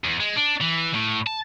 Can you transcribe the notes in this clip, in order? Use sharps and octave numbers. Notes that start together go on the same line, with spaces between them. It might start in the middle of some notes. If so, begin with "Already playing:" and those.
E2
G#3
D4
E3
A2
A5